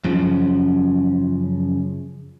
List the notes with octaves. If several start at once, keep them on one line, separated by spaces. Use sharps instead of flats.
F#2 C#3 F3